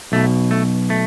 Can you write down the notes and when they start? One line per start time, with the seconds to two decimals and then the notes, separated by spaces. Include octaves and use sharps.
0.12 B1 B2 A3
0.51 A3
0.90 A3